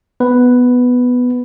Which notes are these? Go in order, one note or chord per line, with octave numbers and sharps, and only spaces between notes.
B3 B4